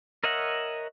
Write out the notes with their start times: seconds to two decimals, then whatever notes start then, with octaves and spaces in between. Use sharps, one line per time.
0.24 A#4 C#5 D#5 E5 F#5